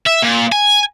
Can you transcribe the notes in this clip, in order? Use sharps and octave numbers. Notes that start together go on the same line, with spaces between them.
E5
A#2
G#5